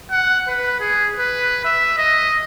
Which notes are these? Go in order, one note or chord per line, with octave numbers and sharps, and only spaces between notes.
F#5
B4
G#4
B4
E5
D#5